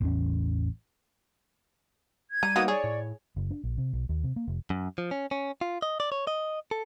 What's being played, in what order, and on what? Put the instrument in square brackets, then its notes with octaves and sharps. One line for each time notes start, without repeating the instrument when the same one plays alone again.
[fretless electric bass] A1 E2 C#4
[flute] G#6
[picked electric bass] G3 [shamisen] A#5 [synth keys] D#7
[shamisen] F#3 A#3 B3 [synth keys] D#4 D#6 D#7
[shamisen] G#4 [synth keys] C#5 [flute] D5
[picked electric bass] A2
[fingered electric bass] F#1
D4
A#1
C3
B1
D#2
C3
A#3
F1
[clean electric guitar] F#2
F3
C#4
C#4
F4
D#5
D5
C#5
D#5
A4